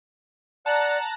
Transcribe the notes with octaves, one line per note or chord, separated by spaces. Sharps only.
D5 F#5 A5 A#5 F#6